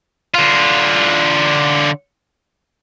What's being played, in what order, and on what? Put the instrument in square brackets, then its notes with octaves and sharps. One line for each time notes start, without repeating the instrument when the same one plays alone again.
[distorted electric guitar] D3 F4